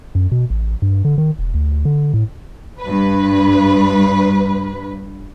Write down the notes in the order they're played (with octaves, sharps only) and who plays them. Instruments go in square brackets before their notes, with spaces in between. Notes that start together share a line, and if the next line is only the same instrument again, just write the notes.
[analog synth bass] F#2
B2
A1
G2
D3
D#3
E1
D2
D3
A2
[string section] G2 B4